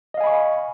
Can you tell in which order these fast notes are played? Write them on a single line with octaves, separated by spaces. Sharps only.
D#5 F5 G#5 B5 C#6